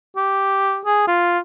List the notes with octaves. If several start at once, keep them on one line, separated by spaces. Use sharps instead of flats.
G4
G#4
F4